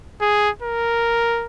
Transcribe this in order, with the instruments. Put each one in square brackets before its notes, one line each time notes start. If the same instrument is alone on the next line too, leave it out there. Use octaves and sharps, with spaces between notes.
[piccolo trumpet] G#4
A#4